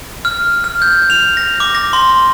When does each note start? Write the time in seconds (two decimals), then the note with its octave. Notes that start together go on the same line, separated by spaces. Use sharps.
0.25 F6
0.64 F6
0.82 G6
1.10 F7
1.37 A#6
1.60 D6
1.75 A#6
1.93 C6